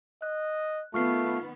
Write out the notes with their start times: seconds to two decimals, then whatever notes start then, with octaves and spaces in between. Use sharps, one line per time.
0.22 D#5 F#6
0.94 D#3 A3 B3 F4 C#6 F6 C7